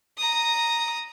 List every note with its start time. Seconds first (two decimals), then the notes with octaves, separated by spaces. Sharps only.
0.18 A#5 D#6